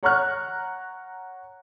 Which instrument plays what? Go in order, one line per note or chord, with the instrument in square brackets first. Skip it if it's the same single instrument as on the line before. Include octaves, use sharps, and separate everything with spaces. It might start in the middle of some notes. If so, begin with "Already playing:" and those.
[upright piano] C#5 F#5 A#5 C#6 F6 F#6